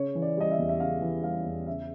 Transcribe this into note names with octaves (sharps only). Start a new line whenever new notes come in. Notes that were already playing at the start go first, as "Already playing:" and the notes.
Already playing: C#3 C#5
E3
D5
G3 D#5
E5
E2
E5
C#3 F5
E3
G3 F5
E2
C#3 E5